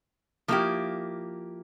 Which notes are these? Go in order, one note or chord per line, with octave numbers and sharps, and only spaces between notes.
F3 A#3 E4 G4